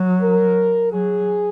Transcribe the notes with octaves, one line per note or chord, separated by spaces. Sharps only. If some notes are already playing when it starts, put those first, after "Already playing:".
Already playing: F#3
A#4
F#3 G#4